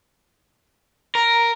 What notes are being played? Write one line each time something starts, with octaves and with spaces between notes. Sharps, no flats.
A#4